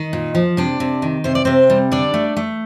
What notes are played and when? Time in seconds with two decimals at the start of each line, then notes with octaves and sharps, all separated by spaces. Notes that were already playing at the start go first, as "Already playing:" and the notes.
Already playing: D#3 D#4
0.13 A#2
0.35 F3
0.57 C3 D4
0.80 C3
1.02 D#3
1.24 C3 C5
1.35 D5
1.45 C3 C4 C5
1.70 G3
1.91 D3 D4 D5
2.14 A3
2.36 A3